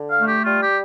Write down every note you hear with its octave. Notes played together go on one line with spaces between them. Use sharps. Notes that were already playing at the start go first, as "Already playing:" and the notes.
Already playing: D3
F5
A3
G4
G3 F4
G4